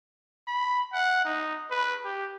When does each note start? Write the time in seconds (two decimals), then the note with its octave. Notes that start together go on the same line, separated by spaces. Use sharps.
0.47 B5
0.93 F#5
1.25 D#4
1.70 B4
2.04 G4